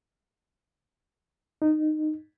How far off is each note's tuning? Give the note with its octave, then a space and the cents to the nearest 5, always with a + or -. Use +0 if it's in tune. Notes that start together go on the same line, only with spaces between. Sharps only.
D#4 -15